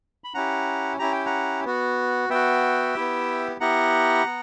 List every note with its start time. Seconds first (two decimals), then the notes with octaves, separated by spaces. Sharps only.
0.24 B5
0.34 C#4 E4 G4 F#5 A#5
0.99 C#4 E4 G4 A#5
1.12 G5
1.26 F#5 A#5
1.65 B3 F#4
2.29 B3 F#4 E5 G5
2.95 B3 E4 G4
3.60 B3 E4 G4 F#5 A#5
4.26 B3